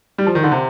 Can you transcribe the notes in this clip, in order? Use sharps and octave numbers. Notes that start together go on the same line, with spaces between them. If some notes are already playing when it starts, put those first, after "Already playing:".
G3
F3
D#3
D3
C3